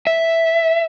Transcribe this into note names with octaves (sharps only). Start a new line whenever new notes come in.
E5